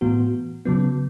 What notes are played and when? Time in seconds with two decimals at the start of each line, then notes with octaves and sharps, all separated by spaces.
0.01 A2 E3 B3 F#4
0.65 C#3 F#3 B3